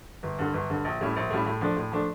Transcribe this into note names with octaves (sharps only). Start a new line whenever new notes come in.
G1
G2 D3
G1
G2 D3
A#1
A2 G3 C#4 E4
A#1
A2 G3 C#4 E4
A2
F3 A3 D4
A2
F3 A3 D4